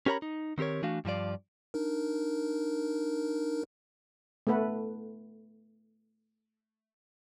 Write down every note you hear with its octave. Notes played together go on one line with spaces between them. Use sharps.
C#4 G4 A#4 C#5 A#5 B5
D#4
D#3 C4 G4 A#4 C#5
E3 A3 D4 F#4 F5
G2 F3 F4 D5
D4 D#4 A#4
A3 B3 A4 B4 F#5